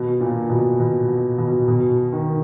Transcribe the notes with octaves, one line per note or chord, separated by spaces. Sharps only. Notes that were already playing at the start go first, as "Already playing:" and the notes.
Already playing: B2
A#2
B2
B2
B2
B2
B2
D#3